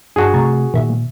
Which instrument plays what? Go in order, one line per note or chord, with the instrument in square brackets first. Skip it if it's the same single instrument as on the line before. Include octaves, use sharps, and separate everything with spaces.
[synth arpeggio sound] G2 D4 [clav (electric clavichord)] F#4 G#4
[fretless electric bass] C3 A3 [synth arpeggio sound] A#5 C#6 A6
[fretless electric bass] A#2 [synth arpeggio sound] D#3 E5